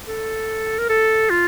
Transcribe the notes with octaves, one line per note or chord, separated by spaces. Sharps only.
A4
A#4
A4
F4